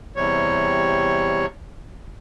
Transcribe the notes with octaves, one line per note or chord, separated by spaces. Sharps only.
E2 C3 G3 C#5